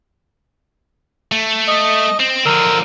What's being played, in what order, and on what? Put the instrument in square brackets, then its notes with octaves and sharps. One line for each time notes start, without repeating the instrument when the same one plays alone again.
[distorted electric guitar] A3
[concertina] D#5
[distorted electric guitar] C4
[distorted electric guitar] D3 F3 [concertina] A#4 E6